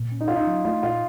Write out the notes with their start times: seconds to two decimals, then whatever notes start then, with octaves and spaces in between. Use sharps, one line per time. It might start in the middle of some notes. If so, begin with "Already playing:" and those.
Already playing: A#2
0.12 C#4
0.21 D#4
0.28 C#4 F4
0.36 D#4
0.47 F#3
0.65 A3 F4
0.83 A#2 F4